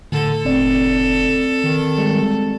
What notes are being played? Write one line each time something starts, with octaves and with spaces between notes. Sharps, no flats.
A2 D3 A4
F1 C4 D5
D#3
G3 G#3